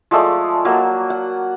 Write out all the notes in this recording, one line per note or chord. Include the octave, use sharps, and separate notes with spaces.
F3 G#3 A3 D5
F#3 A#3
F#5